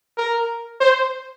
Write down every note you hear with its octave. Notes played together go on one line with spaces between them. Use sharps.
A#4
C5